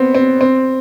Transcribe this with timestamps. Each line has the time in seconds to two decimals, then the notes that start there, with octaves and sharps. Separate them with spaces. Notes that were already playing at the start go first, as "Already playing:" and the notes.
Already playing: B3 C4
0.14 C4
0.41 C4